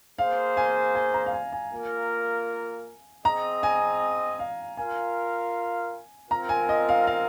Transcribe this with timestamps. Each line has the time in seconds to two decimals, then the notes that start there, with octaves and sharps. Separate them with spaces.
0.19 A#3 G#4 C5 F5
0.57 G#5
0.95 G#5
1.14 A#5
1.26 F5
1.33 G#5
1.53 G#5
1.71 A#3 F4 A#4
3.24 C4 G#4 D#5 A#5
3.63 G#5
4.39 F5
4.77 F4 A#4 F5 G#5
6.30 C4 F4 A#4 A#5
6.49 G#5
6.69 D#5
6.89 F5
7.07 F5